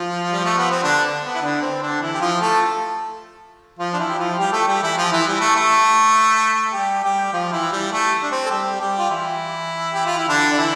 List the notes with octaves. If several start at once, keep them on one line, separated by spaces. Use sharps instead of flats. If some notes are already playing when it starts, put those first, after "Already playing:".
Already playing: F3 F4
G3
A3
B3
C4
D3 D4
B3
E4
D3 D4
C4
D3 D4
E3 E4
G4
F3 F4
A3 A4
F3 F4
D4
E3 E4
G4
F3 F4
G3 G4
A3 A4
G3 G4
E3 E4
F3 F4
E3 E4
G3
A3
A3
G3 G4
G3 G4
F3 F4
E3 E4
G3
A3
D4
C4
A4
G3 G4
G3 G4
F4
E3 E4
G4
F4
E4
D3 D4
D4
E3 E4